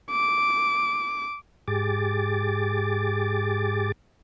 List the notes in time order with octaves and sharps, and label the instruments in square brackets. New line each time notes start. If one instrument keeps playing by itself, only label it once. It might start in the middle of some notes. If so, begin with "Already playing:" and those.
[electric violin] D6
[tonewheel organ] G#2 G4 G#4 D6 A6